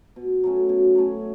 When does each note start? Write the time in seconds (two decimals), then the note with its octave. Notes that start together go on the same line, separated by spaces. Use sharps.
0.16 B2
0.44 F#3 A3 C#4
0.69 B2
0.95 F#3 A3 C#4